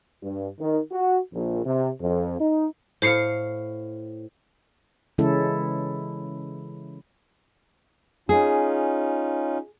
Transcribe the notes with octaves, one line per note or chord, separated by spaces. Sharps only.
G2
D#3
F#4
A#1
C3
F2
D#4
A2 C5 F5 C7 C#7
C#3 E3 G#3 C#4 E4 A4
C#4 D#4 F4 G#4